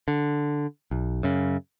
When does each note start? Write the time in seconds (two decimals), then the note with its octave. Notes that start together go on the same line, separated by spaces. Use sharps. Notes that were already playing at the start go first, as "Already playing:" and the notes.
0.08 D3
0.91 B1
1.23 F#2 C#3